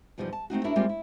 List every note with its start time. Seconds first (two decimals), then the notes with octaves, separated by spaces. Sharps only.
0.18 E2 B2 F3 G3 D#4 D#5
0.33 A5
0.50 A3 C4 D#4 F#4
0.64 D4 E4 F#4 A#4 C#5 E5
0.76 G3 G#3 A#3 C4 F4 G4
0.89 E4